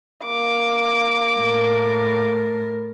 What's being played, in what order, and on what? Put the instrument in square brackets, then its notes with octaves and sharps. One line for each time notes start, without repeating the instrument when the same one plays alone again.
[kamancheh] A#3 D6
[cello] A2 A#4